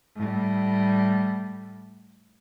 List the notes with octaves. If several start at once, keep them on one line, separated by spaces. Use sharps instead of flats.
A2 G3